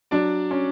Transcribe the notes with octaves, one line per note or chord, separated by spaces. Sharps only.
F#3 D4 D5
C#4